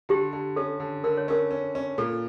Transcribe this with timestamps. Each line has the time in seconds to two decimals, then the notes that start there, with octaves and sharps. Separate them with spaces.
0.09 D3 G4
0.33 D3
0.56 C#4 A4
0.80 D3
1.04 D3 A#4
1.17 C#5
1.28 C#4 A#4
1.51 C#4
1.75 C#4
1.98 A#2 A4